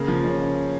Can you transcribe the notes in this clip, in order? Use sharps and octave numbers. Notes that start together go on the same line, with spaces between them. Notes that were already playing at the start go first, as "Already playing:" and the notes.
Already playing: C#3 A#3
F3
C#4